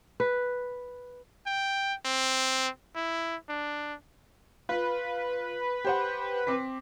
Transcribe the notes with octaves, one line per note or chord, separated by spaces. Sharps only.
B4
G5
C4
E4
D4
F4 B4
G4 C5 F#5
C4 D6 B6